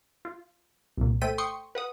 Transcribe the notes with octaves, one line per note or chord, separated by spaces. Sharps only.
F4
C2 A#2
A3 A4 C5 G5 B6 D#7
G5 C6 C#6 D#6 C#7
B4 F#5 D#6